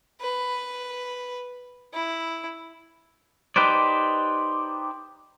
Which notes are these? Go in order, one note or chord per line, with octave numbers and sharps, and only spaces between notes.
B4
E4
D#4 G4 B4 C5 D5